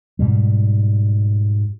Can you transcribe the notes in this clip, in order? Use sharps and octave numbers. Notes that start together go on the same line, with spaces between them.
G#2 B2 G3